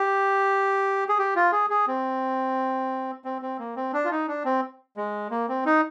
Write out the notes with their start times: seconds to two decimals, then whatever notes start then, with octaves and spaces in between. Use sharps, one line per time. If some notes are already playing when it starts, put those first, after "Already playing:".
Already playing: G4
1.09 G#4
1.19 G4
1.36 F4
1.52 G#4
1.70 G#4
1.87 C4
3.25 C4
3.42 C4
3.59 A#3
3.76 C4
3.93 D4
4.05 F4
4.11 D#4
4.28 D4
4.45 C4
4.97 G#3
5.31 A#3
5.49 C4
5.66 D#4